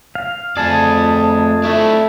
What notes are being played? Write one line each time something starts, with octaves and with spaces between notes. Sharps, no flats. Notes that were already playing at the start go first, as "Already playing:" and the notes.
F5
F2 A3 G#4 D5 A5
A3 D4 E4